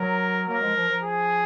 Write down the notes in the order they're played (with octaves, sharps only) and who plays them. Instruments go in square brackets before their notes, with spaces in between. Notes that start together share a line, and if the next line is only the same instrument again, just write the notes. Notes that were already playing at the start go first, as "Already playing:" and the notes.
Already playing: [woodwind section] F#3 [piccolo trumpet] A#4
[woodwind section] F#3 A#3 [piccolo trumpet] A#4
[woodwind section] F3 G#3
F3
F3
[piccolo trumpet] G#4